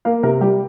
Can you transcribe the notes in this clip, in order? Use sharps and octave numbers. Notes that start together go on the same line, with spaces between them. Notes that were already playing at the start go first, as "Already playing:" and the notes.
A#3 F5
C3 A#4
G3 G4